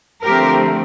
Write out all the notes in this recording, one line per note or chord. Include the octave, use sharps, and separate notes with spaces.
D3 F3 A3 C4 G4 A#4